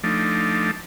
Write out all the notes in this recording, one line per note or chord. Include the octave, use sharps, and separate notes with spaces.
F3 A3 D4 D#4